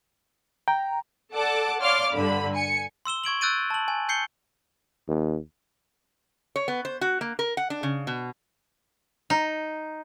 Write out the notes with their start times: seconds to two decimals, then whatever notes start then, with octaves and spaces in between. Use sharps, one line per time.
0.68 G5 A#5
1.32 A4 D5 F#5 A5 D6
1.81 C#5 D5 F5 C6 D6 F6
2.13 G2 D3 B5
2.53 G#5 C#7
3.05 C6 E6 E7 G7
3.24 C#6 G#6 D7 F#7
3.41 E6 F#6 G6 A6 D7 D#7
3.70 A5 F#7
3.88 G#5
4.09 G6 C7 C#7 G7
5.08 D#2
6.56 C#5
6.68 B3
6.85 C5
7.01 F#4
7.21 A#3
7.39 A#4
7.57 F#5
7.70 D4
7.83 C#3
8.07 B2
9.30 D#4